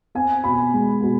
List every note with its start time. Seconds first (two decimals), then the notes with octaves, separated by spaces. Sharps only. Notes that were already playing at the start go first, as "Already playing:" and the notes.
0.15 C4 G#5
0.44 B2 B5
0.74 G#3
1.02 B2